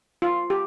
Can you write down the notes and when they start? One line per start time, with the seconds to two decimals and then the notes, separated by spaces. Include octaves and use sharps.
0.22 F4
0.50 G4